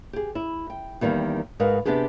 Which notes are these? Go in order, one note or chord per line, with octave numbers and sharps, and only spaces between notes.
G4 G#4
E4
G5
E2 D#3 G3 A#3 C4
G#2 D#4 A#4 B4 F5
C3 A#3 B3 D4 G4 G#4